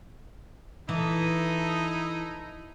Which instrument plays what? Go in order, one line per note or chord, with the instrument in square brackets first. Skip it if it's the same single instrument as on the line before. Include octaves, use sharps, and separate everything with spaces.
[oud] E3 [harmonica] D#4 E4 [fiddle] A4 D#6